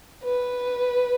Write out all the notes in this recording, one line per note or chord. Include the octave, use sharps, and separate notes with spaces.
B4